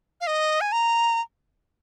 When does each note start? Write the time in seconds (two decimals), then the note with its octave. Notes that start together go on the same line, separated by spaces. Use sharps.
0.21 F5
0.27 D#5
0.61 G#5
0.72 A#5